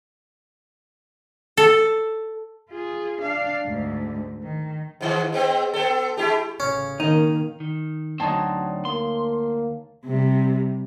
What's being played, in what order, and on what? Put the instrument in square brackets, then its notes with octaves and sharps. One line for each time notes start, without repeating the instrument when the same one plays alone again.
[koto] A4
[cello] F4 G#4
D4 F5
D2 G#2
D#3
[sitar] G#2 D#3 E3
G#3 B3 C4
B3 A4
G#3 E4 G4
[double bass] A1 C#3 [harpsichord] C#4
[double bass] D#3 A#3 [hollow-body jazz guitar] D#4
[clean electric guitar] D#3
[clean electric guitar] D2 G2 [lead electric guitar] F#3 C4 [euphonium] D4 [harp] D#4 C#5 A5
[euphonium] A#3 [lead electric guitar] C6
[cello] C3 G3